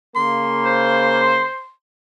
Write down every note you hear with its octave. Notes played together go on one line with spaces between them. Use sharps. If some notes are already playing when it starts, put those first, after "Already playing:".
C#3 A#3 C6
C5